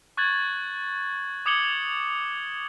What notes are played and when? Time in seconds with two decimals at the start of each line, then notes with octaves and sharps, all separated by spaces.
0.17 C#6 F#6 G#6 A6 F#7
1.46 D6 D#6 G#6 C#7 F#7 G7